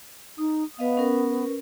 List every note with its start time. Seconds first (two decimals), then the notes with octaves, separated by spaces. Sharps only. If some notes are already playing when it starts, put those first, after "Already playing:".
0.38 D#4 D#6
0.79 B3 B4 D#5 F5
0.97 C#4 A#4 B4